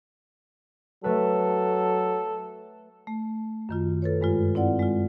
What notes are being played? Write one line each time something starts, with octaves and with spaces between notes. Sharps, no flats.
F#3 A3 A4 B4
A3
F#2 D#3 F4
A4 B4 C#5
G2 G#3 F4
C4 E4 D5 F#5
G#3 F4